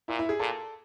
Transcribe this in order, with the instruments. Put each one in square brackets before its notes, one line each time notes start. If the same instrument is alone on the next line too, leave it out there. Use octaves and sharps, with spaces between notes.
[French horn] A#2 [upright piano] E4
[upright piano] E4
G#4
[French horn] A#2 [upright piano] A4